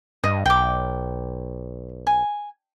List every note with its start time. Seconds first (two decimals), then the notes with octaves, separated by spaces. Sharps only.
0.24 G2 D#5
0.46 B1 G5 D6
2.07 G#5